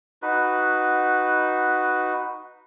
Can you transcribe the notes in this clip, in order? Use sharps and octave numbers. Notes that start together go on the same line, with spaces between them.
D#4 F#4 B4